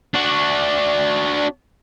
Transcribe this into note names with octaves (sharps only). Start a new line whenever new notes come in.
D4 F#4